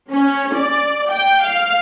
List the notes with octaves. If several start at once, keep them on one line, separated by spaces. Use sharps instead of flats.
C#4
D5
G5
F5